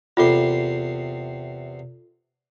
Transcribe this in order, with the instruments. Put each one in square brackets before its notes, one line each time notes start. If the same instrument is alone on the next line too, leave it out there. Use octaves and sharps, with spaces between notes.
[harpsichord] E2 C3 C6 [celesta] F4 A4